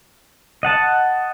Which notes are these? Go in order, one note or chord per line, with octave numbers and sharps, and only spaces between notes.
D#5 F#5 A5